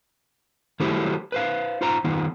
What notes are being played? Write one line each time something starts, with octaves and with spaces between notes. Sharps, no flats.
D#3 F#3 A3 E4 G4 C5
B4 C5 F5
D#4 F4 C5 A#5
D#3 B3 D#4 F4